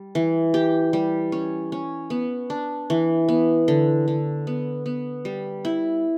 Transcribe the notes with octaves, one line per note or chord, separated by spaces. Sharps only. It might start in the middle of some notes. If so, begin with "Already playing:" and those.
Already playing: G3
E3
G4
G3
C#4
C#4
B3
D4
E3
B3
D3
D3
B3
B3
G3
E4